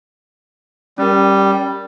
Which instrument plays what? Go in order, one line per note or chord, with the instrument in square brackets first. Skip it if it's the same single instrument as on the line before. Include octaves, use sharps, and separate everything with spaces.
[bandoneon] G3 [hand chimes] C#4 A#4